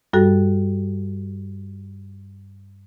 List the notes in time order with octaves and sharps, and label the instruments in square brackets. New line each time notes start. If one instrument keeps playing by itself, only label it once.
[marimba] G2 G3 F#4 A4